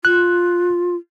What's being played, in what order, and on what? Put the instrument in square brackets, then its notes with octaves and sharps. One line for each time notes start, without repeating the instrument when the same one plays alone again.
[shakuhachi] F4 [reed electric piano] F#6